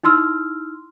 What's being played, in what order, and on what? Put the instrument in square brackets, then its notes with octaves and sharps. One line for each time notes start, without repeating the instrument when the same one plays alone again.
[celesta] D#4 E4 C6 E6 F6